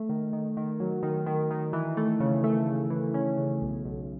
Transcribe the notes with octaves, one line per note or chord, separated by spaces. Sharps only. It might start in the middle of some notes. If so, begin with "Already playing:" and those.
Already playing: A3
D#3
D#3
D#3
F#3
D#3
D#3
D#3
E3
A3
C#3
A3
C#3
E3
C#4
C#3
B1
B1